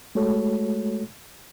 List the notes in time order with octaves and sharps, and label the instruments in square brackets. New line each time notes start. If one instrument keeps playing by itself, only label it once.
[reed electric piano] G#3 A3 F#4 A4 C#5